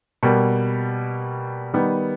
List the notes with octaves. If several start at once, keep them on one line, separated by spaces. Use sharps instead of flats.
B2 G3 A#3
D#3 G3 B3 D#4